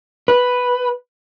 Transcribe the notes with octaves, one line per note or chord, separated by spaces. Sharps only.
B4